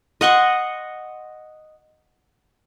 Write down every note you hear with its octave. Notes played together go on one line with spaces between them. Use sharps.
D#5 F#5 C6 C#6